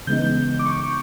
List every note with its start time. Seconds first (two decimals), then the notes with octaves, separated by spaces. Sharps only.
0.07 C#3 E3 G#3 B3 D#4 G6
0.59 D6
0.66 C#6